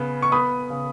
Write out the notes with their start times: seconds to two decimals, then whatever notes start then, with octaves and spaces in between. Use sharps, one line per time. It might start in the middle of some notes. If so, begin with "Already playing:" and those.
Already playing: C#3 B3
0.22 C#6
0.32 B3 B5 D#6
0.70 C#3